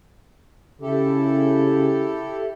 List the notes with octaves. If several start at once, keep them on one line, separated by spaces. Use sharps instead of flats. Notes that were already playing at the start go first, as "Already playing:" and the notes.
C#3 E4 G4 A4